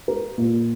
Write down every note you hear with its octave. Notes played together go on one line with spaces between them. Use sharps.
A#4
A#2